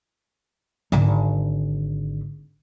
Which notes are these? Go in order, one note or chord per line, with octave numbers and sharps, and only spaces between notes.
G#1 D3